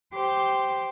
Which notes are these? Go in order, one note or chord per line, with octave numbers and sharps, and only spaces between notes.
G4 C5